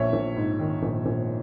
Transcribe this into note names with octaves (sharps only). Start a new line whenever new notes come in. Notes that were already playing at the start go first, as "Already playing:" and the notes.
Already playing: A#1 C#5 E5
A#1
G#2
D#3
A#1
A#1